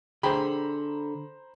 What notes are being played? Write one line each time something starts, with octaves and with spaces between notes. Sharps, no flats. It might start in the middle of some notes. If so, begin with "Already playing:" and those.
D3 G#4 C5 G5 A#5 B5